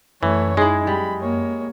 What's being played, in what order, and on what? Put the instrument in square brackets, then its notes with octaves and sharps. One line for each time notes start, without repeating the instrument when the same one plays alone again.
[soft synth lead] F#2 [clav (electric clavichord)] E3 [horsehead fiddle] A3 C#5
[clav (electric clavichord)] G#3 [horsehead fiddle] D#4 [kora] E4 G#4
[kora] G3 [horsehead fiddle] B5
[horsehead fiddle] A#3 C#5